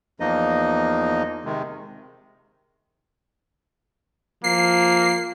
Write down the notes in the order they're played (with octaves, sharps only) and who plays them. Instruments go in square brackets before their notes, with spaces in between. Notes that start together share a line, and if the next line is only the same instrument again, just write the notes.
[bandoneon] E2 F3 A#3 D#4 D#5
C3 D#3 G#3
[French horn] F3 [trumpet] A#3 [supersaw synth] C7